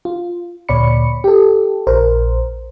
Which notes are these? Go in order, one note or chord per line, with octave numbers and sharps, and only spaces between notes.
F4
D2 A#2 C#5 D5 B5 C#7
G4 A4
A#1 A#4 C5